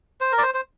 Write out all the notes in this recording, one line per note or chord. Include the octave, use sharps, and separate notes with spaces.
C5
A#4
D5
C5
C5